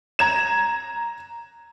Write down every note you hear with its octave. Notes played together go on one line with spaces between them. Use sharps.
A#5 G#6 E7